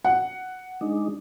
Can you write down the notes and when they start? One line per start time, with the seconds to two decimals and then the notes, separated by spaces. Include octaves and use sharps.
0.05 F#5
0.81 G#3 D4 D#4